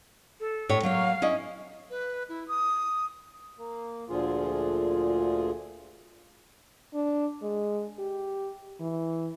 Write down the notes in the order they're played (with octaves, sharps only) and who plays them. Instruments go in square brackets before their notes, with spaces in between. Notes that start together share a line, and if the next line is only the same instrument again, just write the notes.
[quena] A4
[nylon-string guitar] A2 C#5
[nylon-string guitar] F#3 A#3 C#5 [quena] F5
[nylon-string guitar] C#4 E4 D#5
[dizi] B4
E4
D#6
[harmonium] A#3
D2 A#2 D3 F3 F4 G#4
[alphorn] D4
G#3
G4
E3